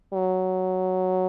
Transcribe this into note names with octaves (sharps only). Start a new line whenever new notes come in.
F#3